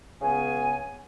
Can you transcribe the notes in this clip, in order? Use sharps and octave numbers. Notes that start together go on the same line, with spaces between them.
C#2 C#3 B3 G#5